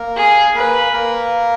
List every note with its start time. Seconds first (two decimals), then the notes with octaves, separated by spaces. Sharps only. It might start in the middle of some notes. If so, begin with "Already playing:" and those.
Already playing: A#3 A#4
0.16 G#4
0.55 A#3 A#4 B4
0.93 A#3 A#4